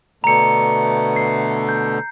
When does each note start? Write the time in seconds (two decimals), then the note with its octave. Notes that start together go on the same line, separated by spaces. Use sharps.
0.24 B2 D3 A3 A#5 C#7
1.16 C7
1.69 G6